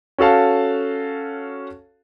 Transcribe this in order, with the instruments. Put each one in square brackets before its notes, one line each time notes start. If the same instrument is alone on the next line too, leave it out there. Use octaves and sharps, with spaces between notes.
[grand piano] C#4 F#4 A4 F5 A5